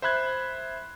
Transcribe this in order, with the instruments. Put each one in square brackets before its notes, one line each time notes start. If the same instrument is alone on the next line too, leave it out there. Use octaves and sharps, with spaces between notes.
[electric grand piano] C5 E5 B5 F#6 G#6